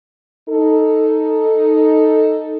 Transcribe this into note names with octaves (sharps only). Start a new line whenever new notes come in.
D#4 A4